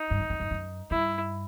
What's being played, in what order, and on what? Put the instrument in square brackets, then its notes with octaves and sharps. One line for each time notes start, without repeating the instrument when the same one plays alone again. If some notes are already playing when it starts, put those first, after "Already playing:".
Already playing: [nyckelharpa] D#4
[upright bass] G2
F#2
F2
F#2
F#2
[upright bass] G2 [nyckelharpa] E4